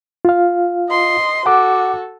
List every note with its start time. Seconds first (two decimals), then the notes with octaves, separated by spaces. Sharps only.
0.25 F4 F5
0.90 D#5 C6
1.46 F#4 A4 F#5 D6